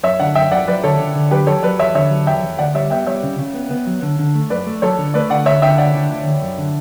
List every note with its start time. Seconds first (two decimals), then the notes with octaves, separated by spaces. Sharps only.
0.03 F#2 C#5 E5
0.20 D3 D5 F#5
0.35 F#2 E5 G5
0.51 F#3 D5 F#5
0.67 F#3 B4 D5
0.84 D3 A4 C#5
1.00 D3
1.15 D3
1.31 F#3 G4 B4
1.47 F#3 A4 C#5
1.63 F#3 B4 D5
1.79 E2 C#5 E5
1.95 D3 C#5 E5
2.11 F#3
2.27 E2 E5 G5
2.42 E2
2.59 D2 D5 F#5
2.75 G3 C#5 E5
2.90 B3 E5 G5
3.07 G3 C#5 E5
3.23 C#3
3.39 C#3
3.55 B3
3.71 B3
3.87 F#3
4.02 D3
4.19 D3
4.35 A3
4.50 F#2 B4 D5
4.67 A3
4.82 F#3 A4 C#5
4.98 D3
5.14 A3 B4 D5
5.30 D3 D5 F#5
5.46 D2 C#5 E5
5.62 D3 E5 G5
5.78 D2 D5 F#5
5.94 D3
6.10 D2
6.26 D2
6.42 F#2
6.58 D3